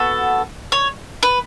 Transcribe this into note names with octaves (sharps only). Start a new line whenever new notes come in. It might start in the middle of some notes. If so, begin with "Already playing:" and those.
Already playing: B3 F#4 A4
C#5
B4